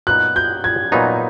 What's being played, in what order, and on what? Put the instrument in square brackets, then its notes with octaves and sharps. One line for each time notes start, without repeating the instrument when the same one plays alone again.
[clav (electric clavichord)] A#2 F#3 B3 D#4 [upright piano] F#6
[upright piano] G6
G#6
[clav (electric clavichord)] A#2 F#3 B3 D#4